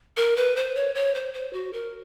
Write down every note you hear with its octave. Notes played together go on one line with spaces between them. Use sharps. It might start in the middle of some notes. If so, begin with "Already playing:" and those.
A#4
B4
C5
C#5
C#5
C5
C5
F#4
A#4